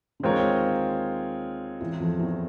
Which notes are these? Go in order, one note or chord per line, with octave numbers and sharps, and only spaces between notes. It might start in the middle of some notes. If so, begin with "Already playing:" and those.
D3
D#2 D#3 G#3 C4 F4 A#4 C#5
E2 E3
F2 F3
E2 E3